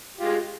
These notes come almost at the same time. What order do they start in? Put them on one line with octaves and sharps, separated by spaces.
G4 F4 G#3